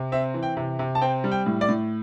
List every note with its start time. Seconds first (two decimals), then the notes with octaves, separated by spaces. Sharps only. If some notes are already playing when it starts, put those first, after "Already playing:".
Already playing: C3
0.12 C4 E5
0.34 E3
0.43 G5
0.57 C3
0.79 C3
0.95 A5
1.01 C4 G5
1.24 G3
1.31 G5
1.46 A2
1.61 D5
1.69 A2